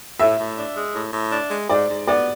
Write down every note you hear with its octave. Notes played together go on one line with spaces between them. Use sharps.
A2 E5
A2
D4
G#3
A2
A2
D4
G#3
G#2 D5
G#2
B3 D5